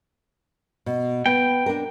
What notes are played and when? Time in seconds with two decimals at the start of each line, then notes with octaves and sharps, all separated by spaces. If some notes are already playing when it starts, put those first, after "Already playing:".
0.86 B2
1.26 B3 G5
1.66 D4 A#4